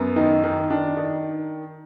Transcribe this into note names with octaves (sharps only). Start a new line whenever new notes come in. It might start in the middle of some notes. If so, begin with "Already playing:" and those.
Already playing: F#2 B3
D#3 D#4
D#3 D#4
D#3 D4
D#3 D#4